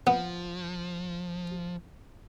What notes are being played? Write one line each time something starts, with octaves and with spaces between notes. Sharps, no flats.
F3 B3